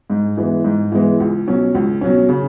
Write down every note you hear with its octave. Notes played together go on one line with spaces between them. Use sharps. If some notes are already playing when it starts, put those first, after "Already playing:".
G#2
E3 G#3 B3
G#2
E3 G#3 B3
C#2
B2 F#3 C#4
C#2
B2 F#3 C#4
C#3